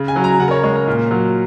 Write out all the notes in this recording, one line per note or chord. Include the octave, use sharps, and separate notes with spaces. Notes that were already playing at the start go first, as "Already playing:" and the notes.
Already playing: C#3
G#5
F#3
A#5
C#3 F#5
A#4
C#5
G#3 C#5
A#4
A#2
F#3